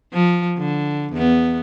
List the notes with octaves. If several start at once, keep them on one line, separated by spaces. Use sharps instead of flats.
F3
D3
E2 B3